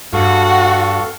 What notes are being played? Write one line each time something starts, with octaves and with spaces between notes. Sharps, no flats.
G2 F#4 A4 F5 C#6